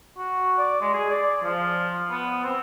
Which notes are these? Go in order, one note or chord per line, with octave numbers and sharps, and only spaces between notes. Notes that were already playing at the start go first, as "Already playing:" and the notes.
F#4
D5
G#3
G#4
D5
F3
B3
C4